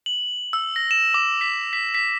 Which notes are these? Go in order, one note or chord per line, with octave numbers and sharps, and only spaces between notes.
F#7
E6
A#6
E7
D6
B6
B6
B6